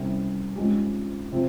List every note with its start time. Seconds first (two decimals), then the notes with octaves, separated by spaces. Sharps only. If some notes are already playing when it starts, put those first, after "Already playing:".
Already playing: C2 C3 G3 C#4
0.55 G#2 F3 G#3 C#4 G4
1.32 C3 F3 C4